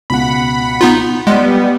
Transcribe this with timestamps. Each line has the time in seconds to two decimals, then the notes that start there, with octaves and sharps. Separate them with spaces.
0.10 C#2 B2 F#5 B5
0.81 B3 D#4 F4
1.27 G3 G#3 B3 F#5 C6